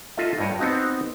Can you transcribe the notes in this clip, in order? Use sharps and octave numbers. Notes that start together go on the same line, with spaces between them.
F4 A4 D#5 E5
G2 C#5 D#5 G5
B3 C4 D#4 F#4